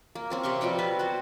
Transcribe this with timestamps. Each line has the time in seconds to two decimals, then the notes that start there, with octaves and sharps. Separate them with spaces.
0.15 A#3
0.30 A#3 C4 C#4
0.43 C3 G4 C6 C#6
0.61 B2 F3 G3 G5
0.78 B4 E5 A5
0.99 F#4 C5